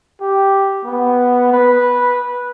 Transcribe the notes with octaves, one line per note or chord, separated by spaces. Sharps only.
G4
B3
B4